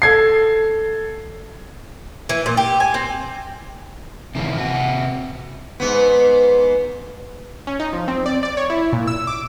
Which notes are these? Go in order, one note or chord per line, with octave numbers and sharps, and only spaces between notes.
A4 G#6 C7
E3
A#2
G4
G#5
C4
C3 D#3 E3 C4
C3 F#4
G#2 B3
C#4
D#4
F3
C4
D5
D5
C#5
E4
A#2
E6
D6